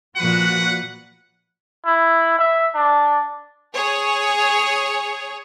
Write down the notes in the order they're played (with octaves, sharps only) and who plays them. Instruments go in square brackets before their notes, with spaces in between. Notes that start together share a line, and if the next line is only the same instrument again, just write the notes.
[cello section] A#2 F3 F#4 [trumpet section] B4 F#5
[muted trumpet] E4
E5
D4
[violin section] G#4 C#5